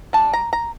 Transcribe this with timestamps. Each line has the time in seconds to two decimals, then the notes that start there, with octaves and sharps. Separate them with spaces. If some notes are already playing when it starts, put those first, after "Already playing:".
0.13 G3 D4 A5
0.33 A#5
0.53 A#5